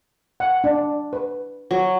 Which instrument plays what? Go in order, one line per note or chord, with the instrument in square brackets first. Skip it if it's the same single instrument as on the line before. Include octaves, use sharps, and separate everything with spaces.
[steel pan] F#5
D4
B4
[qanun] F#3